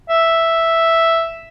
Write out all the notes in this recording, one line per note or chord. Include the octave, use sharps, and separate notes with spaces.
E5